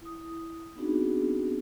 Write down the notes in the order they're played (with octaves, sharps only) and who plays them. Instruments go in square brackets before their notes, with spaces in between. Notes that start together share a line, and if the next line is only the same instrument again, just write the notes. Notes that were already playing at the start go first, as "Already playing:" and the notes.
[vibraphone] E4 D#6
B3 C4 D4 D#4 F#4 G#4